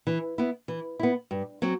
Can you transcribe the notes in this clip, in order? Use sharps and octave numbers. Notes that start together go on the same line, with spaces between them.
E3
B3 E4
E3
B3 E4
G2
F#3 C4